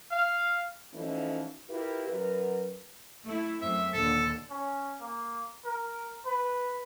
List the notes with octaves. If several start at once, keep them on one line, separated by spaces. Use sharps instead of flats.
F5
E3 F3 A3 C#4 D#4 F#4
E4 F4 G4 A#4 B4
F#2 F#3 A#4 B4
A3 E4
F#2 A3 C4 E5
D#2 A#2 D3 A4
C#4
A#3
A#4
B4